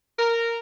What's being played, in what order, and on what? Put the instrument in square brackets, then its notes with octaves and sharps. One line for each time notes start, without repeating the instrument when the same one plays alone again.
[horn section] A#4